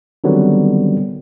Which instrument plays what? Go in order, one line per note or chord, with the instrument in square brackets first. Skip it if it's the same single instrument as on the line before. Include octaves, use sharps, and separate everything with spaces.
[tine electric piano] D3 D#3 F#3 G3 B3 C4